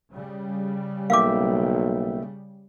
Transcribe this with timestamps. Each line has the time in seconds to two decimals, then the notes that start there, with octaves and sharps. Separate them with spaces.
0.13 C#3 G3
1.10 B1 A#3 E5 F5 G5 D6